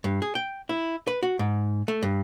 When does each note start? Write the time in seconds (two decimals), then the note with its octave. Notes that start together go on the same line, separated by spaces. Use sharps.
0.04 G2
0.22 G#4
0.35 G5
0.69 E4
1.07 B4
1.23 F#4
1.39 G#2
1.88 A3
2.03 G2